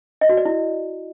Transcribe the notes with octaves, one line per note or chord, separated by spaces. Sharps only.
D#5
F#4
D5
E4